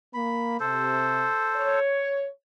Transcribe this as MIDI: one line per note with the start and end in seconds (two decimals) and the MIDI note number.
0.14 0.58 58
0.14 0.57 83
0.60 1.26 48
0.60 1.79 69
0.60 1.79 72
1.56 2.28 73